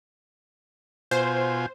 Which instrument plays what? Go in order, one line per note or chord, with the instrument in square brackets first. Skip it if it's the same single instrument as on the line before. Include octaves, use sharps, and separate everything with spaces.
[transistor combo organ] B2 F4 G#5 [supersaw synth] C5